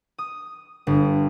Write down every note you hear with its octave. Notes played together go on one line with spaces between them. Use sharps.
D#6
G1